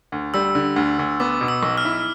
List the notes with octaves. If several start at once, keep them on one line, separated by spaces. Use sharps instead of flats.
D2
G3 E6
D3
D2
D2
B3 D6
B2
E6
B1
F6
E4